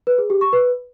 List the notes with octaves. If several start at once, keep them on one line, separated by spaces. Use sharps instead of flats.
B4
G#4
G4
C#6
B4